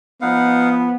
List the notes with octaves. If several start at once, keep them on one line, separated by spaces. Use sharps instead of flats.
F3 B3 D#4 F5 F#5